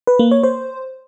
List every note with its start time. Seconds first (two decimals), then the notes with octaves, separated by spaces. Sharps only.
0.07 B4
0.19 A#3
0.31 C#5
0.43 C5